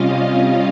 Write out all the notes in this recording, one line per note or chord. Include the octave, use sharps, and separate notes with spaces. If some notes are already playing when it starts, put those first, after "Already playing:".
Already playing: C3 G3 C#4 F4 D#5 F5
F5